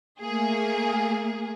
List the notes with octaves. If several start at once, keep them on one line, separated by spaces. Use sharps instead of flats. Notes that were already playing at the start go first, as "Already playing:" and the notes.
A3 A#3 G#4